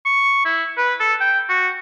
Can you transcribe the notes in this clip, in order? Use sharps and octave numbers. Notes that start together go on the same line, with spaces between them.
C#6
E4
B4
A4
G5
F#4